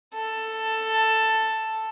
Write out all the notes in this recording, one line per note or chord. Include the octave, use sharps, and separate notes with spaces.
A4